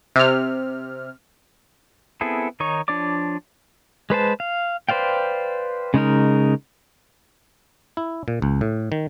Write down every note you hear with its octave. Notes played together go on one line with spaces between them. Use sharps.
C3 F6
B3 C4 E4 G#4 A4
D#3 D#4 C#5 C#6
F3 D4 C#5 D5 D6
G#3 B4 C5 A5
F5
B4 C5 D5 F5 G5
C#3 G#3 D#4 A#4
E4
A#2
C#2
A2
D#3